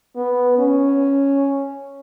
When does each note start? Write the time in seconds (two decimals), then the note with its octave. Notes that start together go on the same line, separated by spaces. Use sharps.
0.16 B3
0.58 C#4